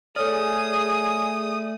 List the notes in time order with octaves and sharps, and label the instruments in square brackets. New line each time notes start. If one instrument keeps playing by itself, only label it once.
[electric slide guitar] A3 D5 [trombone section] G#4 [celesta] A4 C#5 F6 [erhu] D#6